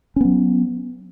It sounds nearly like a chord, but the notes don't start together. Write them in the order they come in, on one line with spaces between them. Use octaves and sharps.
C#4 B3 F#3